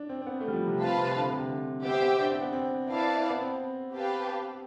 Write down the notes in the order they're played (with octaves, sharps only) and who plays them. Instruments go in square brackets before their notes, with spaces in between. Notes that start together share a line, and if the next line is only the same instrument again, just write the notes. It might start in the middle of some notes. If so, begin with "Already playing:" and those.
Already playing: [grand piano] D4
C4
C4
B3
A3
G3
F3
C3
[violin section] C4 F4 B4 F5 A5
[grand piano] C3
D3
C3
D3
[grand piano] B3 [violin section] G4 C5 E5 G5
[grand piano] B3
D4
C4
B3
C4
[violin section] E4 B4 D5 F5 A5
[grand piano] B3
C4
[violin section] G4 B4 F5 A5